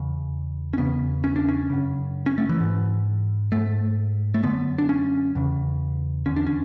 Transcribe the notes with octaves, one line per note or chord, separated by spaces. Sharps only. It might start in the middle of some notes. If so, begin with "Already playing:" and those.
Already playing: E2 C#3
C#4
E2 C#3 B3
C#4
D4
C#4
F#2 C#3
C#4
A3
E3
G#2
G#2 A3
A3
F#2 D3 B3
D4
C#4
E2 C#3
E2 D3 C#4
D4
C#4